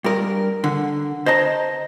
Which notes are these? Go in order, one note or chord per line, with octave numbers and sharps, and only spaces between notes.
G2 A#4
D3
C5 D#5 A5 A#5